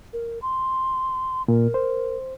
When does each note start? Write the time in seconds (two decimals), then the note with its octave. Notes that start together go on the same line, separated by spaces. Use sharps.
0.13 A#4
0.42 C6
1.48 A#2 A#4
1.74 C5